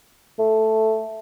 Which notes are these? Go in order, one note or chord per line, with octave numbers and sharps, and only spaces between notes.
A3